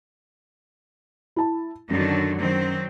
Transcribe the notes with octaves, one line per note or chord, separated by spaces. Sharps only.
E4 A5
F#2 D3 D#3 F#3
D#3 F#3 C4